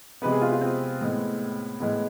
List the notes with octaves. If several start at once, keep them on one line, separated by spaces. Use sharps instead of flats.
C3 G#3 B3 B4
G#4
F4
F4
C4
A2 G#3 B3
A2 G#3 B3